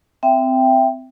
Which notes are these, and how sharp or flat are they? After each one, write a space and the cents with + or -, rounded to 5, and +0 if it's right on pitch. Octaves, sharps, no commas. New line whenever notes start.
C4 -20 E5 +15 G5 +0